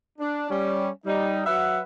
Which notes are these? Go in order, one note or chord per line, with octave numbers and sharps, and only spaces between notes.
D4
G3 C#4
G3 D#4
F#3 B4 E5 F#5